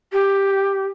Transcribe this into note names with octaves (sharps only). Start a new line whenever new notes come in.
G4